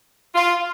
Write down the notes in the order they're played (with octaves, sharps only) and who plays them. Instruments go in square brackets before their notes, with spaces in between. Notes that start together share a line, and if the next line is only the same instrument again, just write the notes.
[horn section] F4